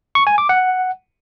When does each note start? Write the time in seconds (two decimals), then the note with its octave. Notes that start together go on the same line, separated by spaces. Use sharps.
0.15 C#6
0.27 G#5
0.38 D6
0.49 F#5